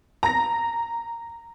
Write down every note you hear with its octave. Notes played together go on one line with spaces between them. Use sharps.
A#5 A#6